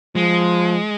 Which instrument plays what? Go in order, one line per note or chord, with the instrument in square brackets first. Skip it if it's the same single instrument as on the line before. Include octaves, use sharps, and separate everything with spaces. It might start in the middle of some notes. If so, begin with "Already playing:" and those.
[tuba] F3 [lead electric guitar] G#3